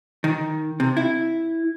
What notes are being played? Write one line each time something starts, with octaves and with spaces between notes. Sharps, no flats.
D#3
C3
E4